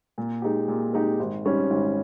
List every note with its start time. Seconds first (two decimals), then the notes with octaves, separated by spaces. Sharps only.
0.18 A#2
0.42 G#3 D#4 G4
0.68 A#2
0.93 G#3 D#4 G4
1.19 G#1
1.45 G#2 G3 C#4
1.70 G#1